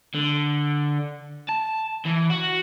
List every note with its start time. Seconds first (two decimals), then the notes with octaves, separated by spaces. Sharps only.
0.14 D3
1.49 A5
2.05 E3
2.30 F#4